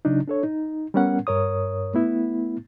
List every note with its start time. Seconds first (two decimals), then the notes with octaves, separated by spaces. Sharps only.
0.05 C#3 F#3 D4 D#4
0.28 D4 A4 C#5
0.43 D#4
0.94 G3 B3 C#4 A#4 F#5
1.27 G2 A#4 C#5 D#6
1.94 A3 B3 E4